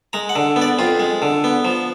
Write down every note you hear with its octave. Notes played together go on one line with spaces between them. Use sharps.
G#3 A#5
F#5
D3
B3
D5
F2 F4
G#3
D3
B3
F3